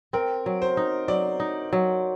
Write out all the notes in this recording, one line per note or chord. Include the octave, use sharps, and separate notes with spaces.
C4 A#4
F#3
C5
D#4
F#3 D5
D#4
F#3